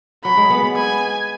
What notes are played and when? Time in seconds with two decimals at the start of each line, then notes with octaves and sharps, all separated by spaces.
0.24 F#3 B5
0.37 G#3
0.50 B3
0.76 G#5